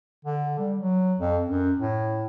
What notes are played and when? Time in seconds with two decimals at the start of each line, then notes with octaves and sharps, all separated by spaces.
0.25 D3
0.59 G3
0.78 F#3
1.19 F2
1.47 F#2
1.79 A2